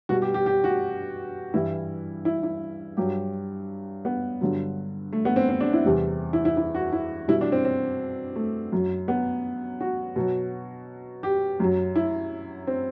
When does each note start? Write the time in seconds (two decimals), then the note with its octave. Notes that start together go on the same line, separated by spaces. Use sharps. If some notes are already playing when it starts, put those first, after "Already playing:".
0.09 B2 G3 F#4
0.22 G4
0.34 G4
0.46 G4
0.64 F#4
1.54 G2 E3 G3 E4
2.25 E4
2.43 E4
2.97 G2 F#3 G4
4.05 B3
4.41 G2 D3 F#3
5.13 A3
5.25 B3
5.36 C4
5.49 C4
5.60 D4
5.73 E4
5.85 E2 C3 G3
6.33 E4
6.45 E4
6.57 E4
6.75 F#4
6.93 E4
7.28 B2 G3 E4
7.41 D4
7.52 C4
7.65 C4
8.36 A3
8.72 F#2 F#3
9.08 B3
9.81 F#4
10.16 B2 F#3
11.23 G4
11.60 F#2 F#3
11.96 E4
12.67 C4